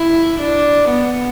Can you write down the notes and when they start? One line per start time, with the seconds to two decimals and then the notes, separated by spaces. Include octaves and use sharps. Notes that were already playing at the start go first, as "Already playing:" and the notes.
Already playing: E4
0.39 D4
0.91 B3